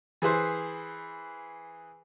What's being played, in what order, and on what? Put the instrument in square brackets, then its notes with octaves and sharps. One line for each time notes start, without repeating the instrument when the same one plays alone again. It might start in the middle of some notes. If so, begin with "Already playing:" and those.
[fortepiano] E3 G#4 B4 C5